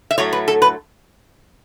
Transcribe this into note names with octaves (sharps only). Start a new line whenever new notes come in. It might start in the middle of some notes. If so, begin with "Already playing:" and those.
E5
A2 F#3 A3 C#5
B4
A4
B4